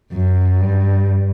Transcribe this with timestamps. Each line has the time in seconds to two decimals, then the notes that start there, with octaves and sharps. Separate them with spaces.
0.13 F#2
0.61 G2